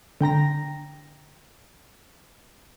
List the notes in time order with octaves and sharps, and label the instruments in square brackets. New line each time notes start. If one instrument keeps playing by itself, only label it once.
[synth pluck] D3 G5 A#5 A#6